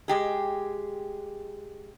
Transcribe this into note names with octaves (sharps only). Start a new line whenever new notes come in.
G#3 G4 G#4